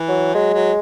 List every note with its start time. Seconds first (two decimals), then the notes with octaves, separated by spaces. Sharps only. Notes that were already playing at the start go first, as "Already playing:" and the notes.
Already playing: E3
0.08 F#3
0.35 F#3 G#3
0.54 F#3